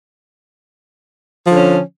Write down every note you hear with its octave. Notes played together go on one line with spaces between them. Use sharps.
D3 F3 C#4